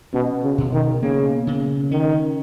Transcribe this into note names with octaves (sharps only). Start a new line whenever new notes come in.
B2 C#4
C#3
B2
D#3
C#3 A#3
C#3
D#3 C#4